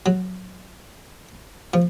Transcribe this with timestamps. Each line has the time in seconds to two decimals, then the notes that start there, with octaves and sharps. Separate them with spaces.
0.06 F#3
1.74 F3